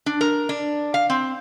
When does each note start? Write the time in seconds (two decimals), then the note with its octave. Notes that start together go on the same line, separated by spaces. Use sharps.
0.06 D4
0.21 A#4
0.49 D4
0.94 F5
1.10 C4